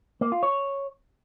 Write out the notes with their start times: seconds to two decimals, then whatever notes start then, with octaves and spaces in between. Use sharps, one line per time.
0.21 A#3
0.32 F4
0.43 C#5